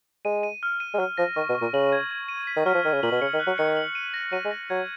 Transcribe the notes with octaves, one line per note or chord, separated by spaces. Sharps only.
G#3 D#7
D#7
F6
D#7
G#3
F#3 F6
F3 A#6
D#3 C#6
B2
C#6
A#2
C#3 F#7
G#6
G#6
D#7
B6
D#3
F#3 F6
F3
D#3 F6
C#3
A#2 F#7
B2
C#3 C#7
D#3
F#6
F#3
D#3 C#7
F#7
D#7
A#6
F#3 D#7
G#3
A#6
F#3 G#6